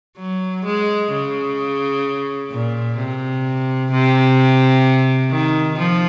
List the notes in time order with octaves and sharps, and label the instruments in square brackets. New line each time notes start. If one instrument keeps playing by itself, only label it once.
[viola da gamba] F#3
G#3
C#3
A#2
C3
C3
D#3
F3